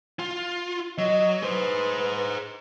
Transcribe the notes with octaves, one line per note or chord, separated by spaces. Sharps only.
F4
F#3 D#5
G#4 B4 C5